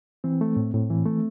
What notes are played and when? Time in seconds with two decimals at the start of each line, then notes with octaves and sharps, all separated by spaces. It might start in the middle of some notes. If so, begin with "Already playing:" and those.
0.24 E3 C4
0.41 A3
0.57 A2
0.74 A2
0.90 E3
1.06 A3